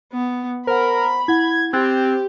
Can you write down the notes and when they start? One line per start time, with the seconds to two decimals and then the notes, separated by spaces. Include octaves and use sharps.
0.12 B3
0.67 A#4 C5 F#5 B5
1.28 E4 F#5 G#6
1.73 C4 G4 F#6 G#6 A6